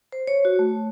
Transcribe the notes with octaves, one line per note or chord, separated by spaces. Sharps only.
C5
C#5
F#4
A3